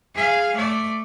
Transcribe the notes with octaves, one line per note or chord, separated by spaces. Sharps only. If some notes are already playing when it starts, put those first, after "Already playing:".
G#4 F5
A3 D5